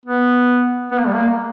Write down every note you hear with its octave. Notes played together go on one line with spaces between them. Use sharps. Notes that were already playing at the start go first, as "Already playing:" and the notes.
B3
B3
A#3
G3
A#3